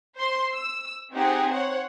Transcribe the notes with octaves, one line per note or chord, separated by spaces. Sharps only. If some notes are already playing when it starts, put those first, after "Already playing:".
C5 C6
E6
C4 D#4 G4 G#4 F#5
C5 C#5 F#5